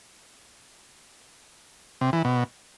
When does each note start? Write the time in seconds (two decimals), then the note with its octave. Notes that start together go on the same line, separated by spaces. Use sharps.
2.01 C3
2.13 E3
2.25 B2